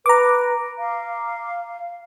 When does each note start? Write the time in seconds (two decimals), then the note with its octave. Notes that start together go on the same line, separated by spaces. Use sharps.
0.06 B4 A#5 D6
0.79 F5